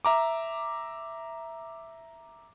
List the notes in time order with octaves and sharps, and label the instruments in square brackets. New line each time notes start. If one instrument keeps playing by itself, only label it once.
[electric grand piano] E5 A#5 D6